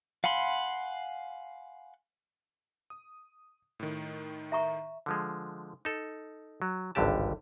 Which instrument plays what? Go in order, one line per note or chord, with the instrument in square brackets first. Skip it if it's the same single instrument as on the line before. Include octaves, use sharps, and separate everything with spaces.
[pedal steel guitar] F5 F#5 G#5 B5 C6
[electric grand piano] D#6
A2 D#3
[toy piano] E5 A#5 C#6
[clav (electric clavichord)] D3 F3 G#3
D#4 A4
F#3
G#1 C#2 G2 D3 G4 A5